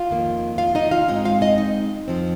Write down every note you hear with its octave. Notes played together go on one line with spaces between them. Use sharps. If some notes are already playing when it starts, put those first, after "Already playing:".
Already playing: F4 F5
F2 D#3 A#3
F4 F5
D#4 D#5
F4 F5
G#2 G#3 C4 D#4 D#5
F4 F5
D#4 D#5
D#4
F2 F3 C4